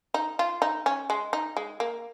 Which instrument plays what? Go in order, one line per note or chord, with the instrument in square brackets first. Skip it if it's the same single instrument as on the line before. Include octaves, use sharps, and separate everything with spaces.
[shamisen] D#4
F4
D#4
C#4
G#3
D#4
G#3
A#3